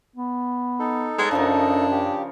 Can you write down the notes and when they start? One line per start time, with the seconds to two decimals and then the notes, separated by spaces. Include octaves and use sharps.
0.16 B3
0.79 D#4 A4
1.18 G#3 B3 C#5 D#5
1.31 F#2 C#3 F3 D4 A#4
1.91 G4